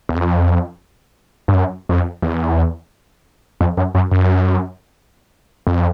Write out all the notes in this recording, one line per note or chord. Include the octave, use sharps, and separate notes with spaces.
E2
F2
G2
F#2
F2
E2
F2
F#2
F#2
F#2
F2